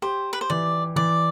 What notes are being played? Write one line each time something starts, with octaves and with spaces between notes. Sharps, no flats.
G4 C5
B4
C5
E3 D5
E3 D5